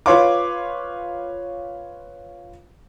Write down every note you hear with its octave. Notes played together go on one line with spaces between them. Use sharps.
F4 B4 C#5 F5 C6 D6